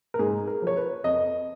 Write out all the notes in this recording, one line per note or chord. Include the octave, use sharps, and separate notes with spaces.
A#4
G#2 G#4
A#4
F3 C#5
B4
F2 D#5